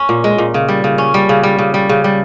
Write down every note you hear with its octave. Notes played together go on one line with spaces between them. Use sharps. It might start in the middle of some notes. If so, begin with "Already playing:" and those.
Already playing: C#4
A#2
G#3
A#2
C#3
G3
C#3
C#4
G3
C#3
G3
C#3
G3
C#3
G3